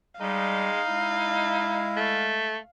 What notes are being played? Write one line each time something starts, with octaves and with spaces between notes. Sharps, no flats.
G3 G#3 D#4 F5
G#3 E4
A3